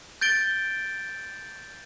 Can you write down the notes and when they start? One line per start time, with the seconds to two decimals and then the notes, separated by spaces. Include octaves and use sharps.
0.21 G6 A6 D7 G7